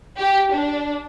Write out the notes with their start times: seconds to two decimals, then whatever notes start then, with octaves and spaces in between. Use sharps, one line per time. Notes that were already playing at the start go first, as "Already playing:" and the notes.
0.18 G4
0.53 D4